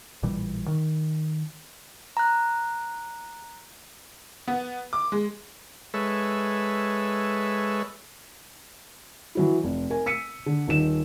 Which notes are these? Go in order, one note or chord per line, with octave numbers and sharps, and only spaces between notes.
A1 A#2 E3 G3
D#3
A#5 F#6
B3
D6
G#3
G#3 A4 B4 C#5 E5
E3 F#3 E4
F1
A#4 G#5
E6 B6 C#7 D#7
D3
D#1 D#4 E7